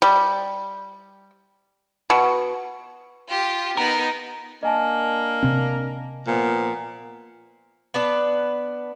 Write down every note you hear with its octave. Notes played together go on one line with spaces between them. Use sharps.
G3
B2
F4 G4
B3 D#4 A#4
A#3 D4 A#4 D#5 G#5 A5
C3 C4
A#2 F3 B3
B3 D4 B4